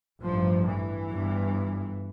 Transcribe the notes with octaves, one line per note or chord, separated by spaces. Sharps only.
A1 G2 F3
E3
G1 G2